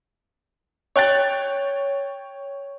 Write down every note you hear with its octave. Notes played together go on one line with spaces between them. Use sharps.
C#5 G5 F#6 A6